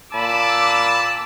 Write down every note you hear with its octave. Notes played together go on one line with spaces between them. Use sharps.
A#2 A5 B5 D6 E6